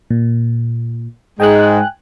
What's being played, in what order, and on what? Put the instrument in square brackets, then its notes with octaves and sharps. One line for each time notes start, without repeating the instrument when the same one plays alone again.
[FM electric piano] A#2
[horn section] G#2 G#3 [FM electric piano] G5 G#5 F#6